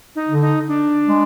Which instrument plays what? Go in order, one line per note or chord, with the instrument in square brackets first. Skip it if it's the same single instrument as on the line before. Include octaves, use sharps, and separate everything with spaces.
[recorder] D#4
[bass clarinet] D3
[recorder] D#4
D4
[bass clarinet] G#3